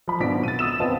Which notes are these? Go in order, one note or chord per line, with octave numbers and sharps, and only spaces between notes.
F3 B5
G#1 B2 F#3 D4 B6 D7
A6 D#7
D#6 E6 E7
B3 C4 D#5 F5 A5